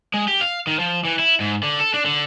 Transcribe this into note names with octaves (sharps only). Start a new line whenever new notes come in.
G#3
G4
F5
D#3
F3
E3
E4
G#2
D3
A4
D4
D3